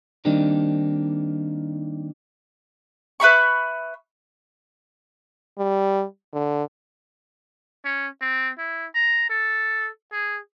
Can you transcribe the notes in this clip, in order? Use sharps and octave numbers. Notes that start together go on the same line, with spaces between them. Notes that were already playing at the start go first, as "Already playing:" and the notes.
D#3 G3 A#3 C4 D4 D#4
B4 E5 B5 C#6
G3
D3
C#4
C4
E4
A#5
A4
G#4